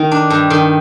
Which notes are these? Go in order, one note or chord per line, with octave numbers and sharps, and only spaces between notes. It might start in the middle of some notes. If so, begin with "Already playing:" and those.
Already playing: D#3
D4
G2
D#3